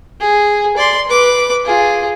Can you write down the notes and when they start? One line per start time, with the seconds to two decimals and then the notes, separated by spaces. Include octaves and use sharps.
0.20 G#4
0.77 D5 C6
1.08 B4 D6
1.65 F4 G#4